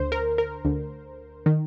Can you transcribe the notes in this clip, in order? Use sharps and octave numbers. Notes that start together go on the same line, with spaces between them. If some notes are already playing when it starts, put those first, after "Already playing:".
Already playing: D2 D3 C5
A#4
A#4
D2 D3
D#3